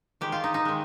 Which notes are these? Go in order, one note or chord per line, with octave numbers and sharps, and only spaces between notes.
D#3 G#3 G4
F4
D#4
D#4
D#3 G#3